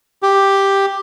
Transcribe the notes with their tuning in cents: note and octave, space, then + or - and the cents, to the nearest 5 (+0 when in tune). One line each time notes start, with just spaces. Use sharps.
G4 +5